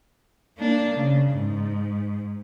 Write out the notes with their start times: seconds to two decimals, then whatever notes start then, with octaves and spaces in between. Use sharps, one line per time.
0.59 A#3 D4
0.95 C#3
1.32 G#2